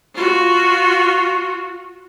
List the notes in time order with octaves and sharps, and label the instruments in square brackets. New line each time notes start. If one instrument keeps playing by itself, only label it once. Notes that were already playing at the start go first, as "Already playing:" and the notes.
[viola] F4 F#4